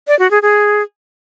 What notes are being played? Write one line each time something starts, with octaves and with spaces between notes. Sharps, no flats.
D5
F#4
G#4
G#4